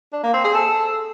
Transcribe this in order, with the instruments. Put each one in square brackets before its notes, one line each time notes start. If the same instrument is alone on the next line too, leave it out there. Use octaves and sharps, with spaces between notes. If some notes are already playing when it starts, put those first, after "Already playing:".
[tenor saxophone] D4
A#3
C4
G#4
A4